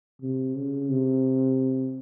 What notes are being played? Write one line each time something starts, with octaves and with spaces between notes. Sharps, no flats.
C3
C#3
C3